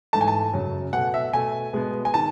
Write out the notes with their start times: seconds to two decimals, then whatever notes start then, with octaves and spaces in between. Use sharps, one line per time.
0.13 G#2 E3 A3 A5
0.21 G#5
0.28 A5
0.53 F#2 C#3 F#3
0.93 B2 A3 F#5
1.14 E5
1.33 B2 A3 G#5
1.73 B2 G#3 B3
2.05 G#5
2.14 D#3 A5